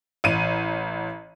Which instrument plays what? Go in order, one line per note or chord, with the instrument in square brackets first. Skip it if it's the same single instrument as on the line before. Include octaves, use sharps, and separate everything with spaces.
[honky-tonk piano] A1 D#7